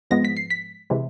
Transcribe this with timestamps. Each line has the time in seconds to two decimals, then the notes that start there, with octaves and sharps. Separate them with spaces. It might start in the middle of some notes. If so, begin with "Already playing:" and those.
0.11 G#2 F3 G#3 B3 A#6
0.25 B6
0.37 C7
0.50 B6
0.90 C3 E3 G#3